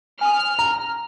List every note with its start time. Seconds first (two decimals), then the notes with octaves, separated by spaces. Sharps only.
0.21 G#5 D#6 F6
0.59 A#5